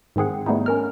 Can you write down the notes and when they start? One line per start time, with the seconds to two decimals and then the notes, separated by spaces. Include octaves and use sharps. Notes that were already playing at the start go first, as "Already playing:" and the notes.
0.16 G#2 D#3 C4 G#4 F#5
0.46 G3 A3 B3 D#4 E4
0.66 C#4 A#4 F6